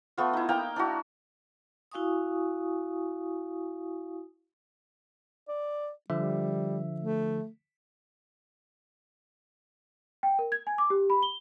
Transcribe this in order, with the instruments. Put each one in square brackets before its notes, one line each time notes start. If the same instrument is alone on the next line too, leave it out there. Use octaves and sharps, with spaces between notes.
[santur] A3 B3 F4
D#4 E4
A#3 F5 G5 A#5
D4 E4 F#4
[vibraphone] E4 F#4 F5 G#5 C#6 D#6
[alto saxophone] D5
[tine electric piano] D3 F3 E5 [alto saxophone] G3
[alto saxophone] A3
[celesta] G5
A#4
G#6
G#5
D6
G4
B5
G7